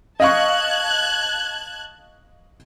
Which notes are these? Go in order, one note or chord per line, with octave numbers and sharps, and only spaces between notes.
D#5 F5 A5 C#6 F#6 G#6